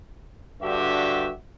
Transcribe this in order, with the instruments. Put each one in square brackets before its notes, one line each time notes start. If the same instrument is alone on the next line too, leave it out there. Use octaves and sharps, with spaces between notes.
[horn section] G2 D3 F#4 G4 E5